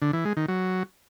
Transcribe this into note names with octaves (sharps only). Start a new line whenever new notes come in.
D3
E3
G#3
D#3
F#3